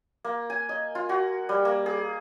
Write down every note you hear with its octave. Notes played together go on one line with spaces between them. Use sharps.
A#3
G#5
D#5
F4
F#4
G3
A#3
G#4